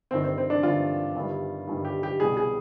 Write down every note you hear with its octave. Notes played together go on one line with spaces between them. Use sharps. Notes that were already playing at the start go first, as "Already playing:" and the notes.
G1 G2 D#3 C4
C4
C4
D4
G1 G2 D#3 F4
G1 G2 D#3 G3
G1 G2 D#3 G3
G4
G4
C2 B2 G3 G#4
G#4